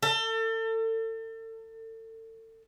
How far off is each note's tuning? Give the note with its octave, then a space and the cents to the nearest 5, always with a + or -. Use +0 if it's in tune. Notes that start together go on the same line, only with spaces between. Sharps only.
A4 +35